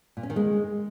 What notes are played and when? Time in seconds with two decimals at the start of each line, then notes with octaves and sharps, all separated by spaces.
0.17 A#2
0.23 C#4
0.30 D#3
0.36 G#3